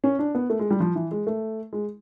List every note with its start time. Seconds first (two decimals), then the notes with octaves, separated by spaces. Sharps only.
0.04 C#4
0.19 D4
0.35 B3
0.50 A3
0.59 G#3
0.71 G3
0.80 F3
0.95 E3
1.11 G#3
1.27 A3
1.73 G#3